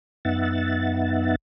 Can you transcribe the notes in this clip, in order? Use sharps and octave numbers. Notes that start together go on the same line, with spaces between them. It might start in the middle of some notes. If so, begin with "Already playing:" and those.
F#2 B3 D#4 E5 F#5 A6